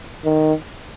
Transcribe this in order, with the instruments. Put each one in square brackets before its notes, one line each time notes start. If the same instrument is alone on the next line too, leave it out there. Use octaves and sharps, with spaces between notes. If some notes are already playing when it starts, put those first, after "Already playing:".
[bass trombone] D#3